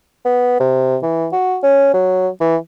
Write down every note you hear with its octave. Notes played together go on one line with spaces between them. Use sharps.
B3
C3
E3
F#4
C#4
F#3
E3